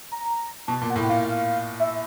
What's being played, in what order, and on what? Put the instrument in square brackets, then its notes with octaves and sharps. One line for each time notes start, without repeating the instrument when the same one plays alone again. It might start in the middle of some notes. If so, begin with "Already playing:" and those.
[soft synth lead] A#5
[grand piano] B2 [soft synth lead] A5
[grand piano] A#2 [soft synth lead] A5
[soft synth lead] F#5
[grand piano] A2 [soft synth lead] G5
[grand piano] A#2 [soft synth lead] F5
[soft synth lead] F5
E5